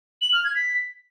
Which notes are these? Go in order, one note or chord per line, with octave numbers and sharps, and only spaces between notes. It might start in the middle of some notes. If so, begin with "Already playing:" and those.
F#7
F6
G#6
B6